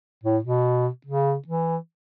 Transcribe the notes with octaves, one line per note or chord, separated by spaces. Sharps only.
A2
B2
C#3
E3